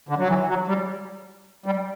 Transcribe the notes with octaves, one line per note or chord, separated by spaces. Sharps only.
D3
F#3
E3
F#3
G3
G3